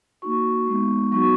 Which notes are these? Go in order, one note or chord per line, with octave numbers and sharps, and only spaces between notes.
A#3 D#4 F#4 C#6
G#3 B3 D#4
F#3 B3 D#4 F#4 C#6